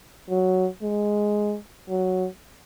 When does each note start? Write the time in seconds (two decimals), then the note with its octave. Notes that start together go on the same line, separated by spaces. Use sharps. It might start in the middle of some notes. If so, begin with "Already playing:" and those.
0.29 F#3
0.82 G#3
1.89 F#3